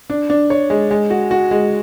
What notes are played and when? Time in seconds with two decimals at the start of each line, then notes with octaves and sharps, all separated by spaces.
0.10 D4
0.30 D4
0.50 C#5
0.70 G#3
0.91 G#3
1.10 F#4
1.31 F#4
1.51 G#3